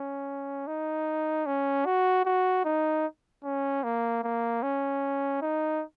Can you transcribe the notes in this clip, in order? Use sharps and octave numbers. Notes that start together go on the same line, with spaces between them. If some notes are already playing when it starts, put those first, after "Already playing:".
Already playing: C#4
D#4
C#4
F#4
F#4
D#4
C#4
A#3
A#3
C#4
D#4